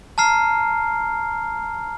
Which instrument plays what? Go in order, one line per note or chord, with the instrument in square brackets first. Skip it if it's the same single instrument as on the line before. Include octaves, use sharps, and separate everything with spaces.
[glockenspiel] A5 A#5 F6 C7